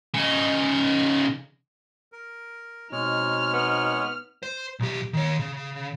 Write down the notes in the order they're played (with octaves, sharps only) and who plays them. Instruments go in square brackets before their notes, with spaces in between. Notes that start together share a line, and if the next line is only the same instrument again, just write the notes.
[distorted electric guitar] C#3 D#4
[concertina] A#4
[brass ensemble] B2 C4 D#4 [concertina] G#3 C#5 [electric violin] F6
[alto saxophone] B3
[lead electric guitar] C5
B1 G4
D#3 C#5
C#3